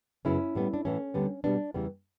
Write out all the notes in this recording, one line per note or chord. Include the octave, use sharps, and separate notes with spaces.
F#2 C#3 F#3 B3 C#4 E4
A2 G3 B3
D4
A2 E3 A3 C#4
D2 D3 G3 B3
B2 G3 B3 D4
E2 C#3 E3 G3 B3